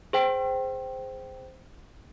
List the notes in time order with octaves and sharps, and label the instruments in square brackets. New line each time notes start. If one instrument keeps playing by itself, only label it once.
[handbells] G#4 C5 G5